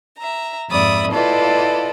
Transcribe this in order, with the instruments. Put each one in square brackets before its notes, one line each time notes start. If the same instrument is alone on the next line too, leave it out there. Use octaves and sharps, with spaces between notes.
[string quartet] E5 A#5
F2 G#2 D5 E5 B5 D#6
E4 F4 A4 B4 D5 D#5